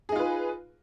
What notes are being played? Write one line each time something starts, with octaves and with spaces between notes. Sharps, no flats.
D#4 F4 G#4 B4